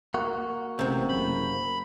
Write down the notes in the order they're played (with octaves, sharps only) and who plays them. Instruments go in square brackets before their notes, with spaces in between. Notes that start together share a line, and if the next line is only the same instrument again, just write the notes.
[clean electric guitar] A#3 F#4
[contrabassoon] A1 [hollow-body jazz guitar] C3 C4
[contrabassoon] F#1 [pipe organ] B5